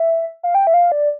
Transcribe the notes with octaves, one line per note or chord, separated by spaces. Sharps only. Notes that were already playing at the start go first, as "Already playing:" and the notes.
Already playing: E5
F5
G5
E5
F5
D5